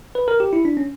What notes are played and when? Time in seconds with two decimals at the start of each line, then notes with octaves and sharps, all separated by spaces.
0.15 B4
0.28 A#4
0.40 G4
0.53 E4
0.65 D4
0.77 C#4